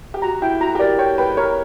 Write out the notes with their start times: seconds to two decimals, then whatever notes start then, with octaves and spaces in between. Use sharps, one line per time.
0.14 G4
0.22 F#4 A#5
0.42 E4 G5
0.60 F#4 A#5
0.75 G4
0.79 A#4 D5
0.99 C#5 G5
1.18 B4 G5
1.37 A#4 C#5